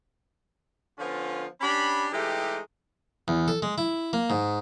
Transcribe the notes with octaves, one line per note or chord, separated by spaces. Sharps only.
D3 F3 B3 C#4 F4
C#4 D4 G4 B5
E3 G#3 A3 D#4 G4
E2
A4
G#3
E4
A#3
G#2